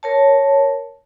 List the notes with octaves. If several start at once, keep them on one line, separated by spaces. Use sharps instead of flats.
A#4 C#5 A5